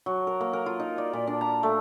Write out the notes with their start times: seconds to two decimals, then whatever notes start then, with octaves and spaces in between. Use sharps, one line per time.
0.06 F#3
0.27 A#4
0.41 A#3
0.53 A#4
0.66 F4
0.80 D#4
0.98 D5
1.13 A#2
1.27 D4
1.41 A#5
1.63 A3